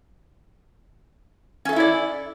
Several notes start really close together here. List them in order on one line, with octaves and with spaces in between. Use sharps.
C#4 A4 E5 E4 D5